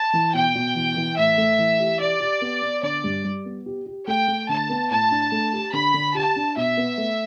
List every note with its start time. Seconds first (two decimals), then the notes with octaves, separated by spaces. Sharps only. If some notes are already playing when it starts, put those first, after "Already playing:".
Already playing: A5
0.13 E3
0.34 B2 G5
0.55 B2
0.75 E3
0.96 E3
1.17 A2 E5
1.38 A3
1.58 E3
1.80 G4
2.00 G4 D5
2.20 G4
2.41 B3
2.62 B3
2.83 D3 D5
3.04 G2
3.24 G3
3.45 B3
3.66 G4
3.86 G4
4.07 A3 G5
4.28 A3
4.49 D3 A5
4.69 B3
4.90 A2 A5
5.11 D4
5.32 A3
5.53 G4
5.73 D3 B5
5.94 D3
6.15 G4 A5
6.36 D4
6.56 B2 E5
6.77 B3
6.98 A3